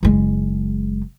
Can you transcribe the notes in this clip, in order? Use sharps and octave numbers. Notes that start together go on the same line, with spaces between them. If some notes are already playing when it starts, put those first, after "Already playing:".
F#1 G#3